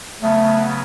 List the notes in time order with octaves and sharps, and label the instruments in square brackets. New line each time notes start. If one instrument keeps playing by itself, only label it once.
[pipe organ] C#3 F#3 B3 [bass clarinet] A3